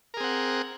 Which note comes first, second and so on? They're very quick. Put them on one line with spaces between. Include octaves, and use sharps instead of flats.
A#4 G#4 C4 F#5